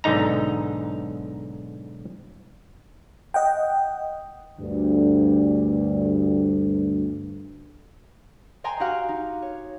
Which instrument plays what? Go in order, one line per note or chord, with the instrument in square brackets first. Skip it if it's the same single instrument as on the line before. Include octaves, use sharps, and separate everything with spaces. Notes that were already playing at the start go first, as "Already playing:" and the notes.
[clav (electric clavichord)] B1 G#2 D3 D#4 A#5
[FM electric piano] D#5 F#5 G5
[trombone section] D2 G2
[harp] C5 D#5 G5 G#5 A#5 C6
F#4 G4 D#5 F5 F#5
D#4
C#5